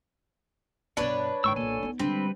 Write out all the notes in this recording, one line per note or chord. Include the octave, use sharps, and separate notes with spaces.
G2 B2 D4 B4 C#5
G#2 D#3 G5 C#6 E6
B1 A#2 A4 G#5
B3 D#4
D3 G3 G#3 C4 B4